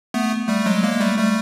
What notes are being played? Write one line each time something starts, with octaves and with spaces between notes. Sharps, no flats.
A3 B3
G3 A3
F#3 G#3
G#3 A#3
G3 A3
G3 A3